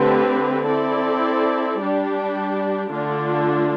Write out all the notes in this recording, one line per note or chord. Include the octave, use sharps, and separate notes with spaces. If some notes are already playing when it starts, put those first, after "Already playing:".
Already playing: D3 A3 C4 G4 B4
C4 E4 A4 D5
G3 D4 G4
D3 A3 D4 F4